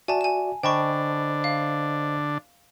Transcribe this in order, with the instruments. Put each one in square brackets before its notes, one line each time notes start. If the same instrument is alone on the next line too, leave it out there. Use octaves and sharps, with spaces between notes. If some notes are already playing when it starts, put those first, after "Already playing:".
[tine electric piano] F#4 D5 E5 [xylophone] G#5 A5
[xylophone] G#5 E7
[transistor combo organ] D3 D4 [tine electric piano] C5 D#5 B5 [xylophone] G5 A5 C#6
[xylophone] F5